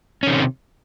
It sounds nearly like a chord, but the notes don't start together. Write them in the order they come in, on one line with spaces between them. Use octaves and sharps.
C#4 D#3 C3